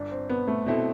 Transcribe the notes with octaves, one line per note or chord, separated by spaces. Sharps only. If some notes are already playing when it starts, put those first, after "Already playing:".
Already playing: G1 D4
C4
B3
A3
B2 A3 C4 E4